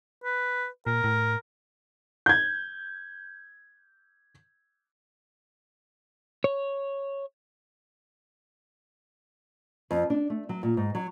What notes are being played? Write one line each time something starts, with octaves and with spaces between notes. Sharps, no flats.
B4
A#2 A#4
A2
G6 G#6
C#5
F2
D4
A3
F#3
A#2
G#2
F#3